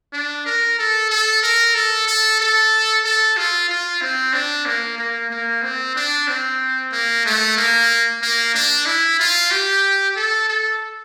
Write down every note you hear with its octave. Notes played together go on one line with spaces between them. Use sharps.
D4
A#4
A4
A4
A#4
A4
A4
A4
A4
F4
F4
C4
D4
A#3
A#3
A#3
C4
D4
C4
A#3
A3
A#3
A#3
D4
E4
F4
G4
A4
A4